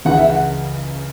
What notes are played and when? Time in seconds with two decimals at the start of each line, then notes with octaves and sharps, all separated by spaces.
0.05 C#2 C#3 E3 F#5
0.18 E5
0.29 F#5